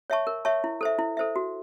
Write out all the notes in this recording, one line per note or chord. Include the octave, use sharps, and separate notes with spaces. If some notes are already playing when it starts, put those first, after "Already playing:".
C#5 E5 A5 C#6
A#4
C#5 E5 A5 C#6
E4
A4 C5 E5
E4
A4 C5 E5
F#4